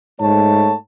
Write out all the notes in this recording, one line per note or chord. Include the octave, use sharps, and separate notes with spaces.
G#2 A3 C#5 A5